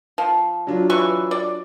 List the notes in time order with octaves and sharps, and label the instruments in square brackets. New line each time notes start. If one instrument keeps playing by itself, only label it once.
[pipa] F3
[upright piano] F#3 D4 F4
[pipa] E3 B4 C#6
D5